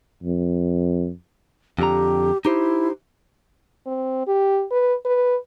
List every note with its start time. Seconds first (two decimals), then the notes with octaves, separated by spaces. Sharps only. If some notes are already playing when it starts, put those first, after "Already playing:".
0.23 F2
1.79 F2 D3 G4 A#5
2.45 D#4 E4 G4 C5
3.86 C4
4.27 G4
4.71 B4
5.05 B4